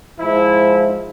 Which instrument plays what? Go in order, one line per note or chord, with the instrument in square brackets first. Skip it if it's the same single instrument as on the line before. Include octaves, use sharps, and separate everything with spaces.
[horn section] G#2 F3 E4